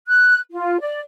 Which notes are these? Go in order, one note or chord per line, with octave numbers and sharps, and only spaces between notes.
F#6
F4
D5